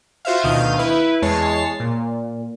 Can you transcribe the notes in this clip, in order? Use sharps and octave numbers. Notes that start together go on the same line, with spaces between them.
F4 F#4 C5 E5 F5
D2 B2 D#3 F5 D#6 G6
E4 B4
E2 G#3 C#5 A5 C7
A#2